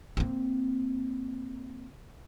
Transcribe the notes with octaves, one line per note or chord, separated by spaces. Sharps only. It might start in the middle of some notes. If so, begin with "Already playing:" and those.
A#3 C4